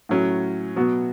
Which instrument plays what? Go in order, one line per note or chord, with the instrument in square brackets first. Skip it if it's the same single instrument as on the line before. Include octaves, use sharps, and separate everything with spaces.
[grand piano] A2 F#3 C#4
B2 F#3 B3 F#4